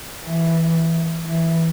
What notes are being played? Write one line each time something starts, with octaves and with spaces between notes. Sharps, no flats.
E3
E3